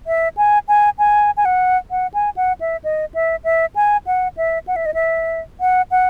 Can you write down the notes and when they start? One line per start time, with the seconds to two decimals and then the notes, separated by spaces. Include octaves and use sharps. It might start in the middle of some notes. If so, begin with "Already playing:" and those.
0.07 E5
0.37 G#5
0.68 G#5
0.99 G#5
1.37 G#5
1.45 F#5
1.91 F#5
2.14 G#5
2.37 F#5
2.61 E5
2.84 D#5
3.14 E5
3.44 E5
3.76 G#5
4.07 F#5
4.37 E5
4.67 F#5
4.76 E5
4.86 D#5
4.94 E5
5.60 F#5
5.91 F#5